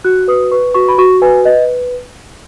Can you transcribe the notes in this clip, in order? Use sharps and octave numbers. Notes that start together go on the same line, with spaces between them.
F#4 F#6
B4 D#6
B4 C#6
F#4 C#6
B5
F#4 C#6
B4 G#5
B4 D#5